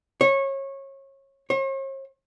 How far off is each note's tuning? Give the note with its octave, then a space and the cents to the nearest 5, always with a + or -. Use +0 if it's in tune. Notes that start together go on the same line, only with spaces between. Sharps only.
C#5 -25
C#5 -45